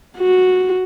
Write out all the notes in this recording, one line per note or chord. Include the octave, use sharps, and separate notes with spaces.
F#4